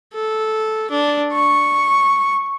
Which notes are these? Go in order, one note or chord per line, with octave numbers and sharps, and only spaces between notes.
A4
D4
C#6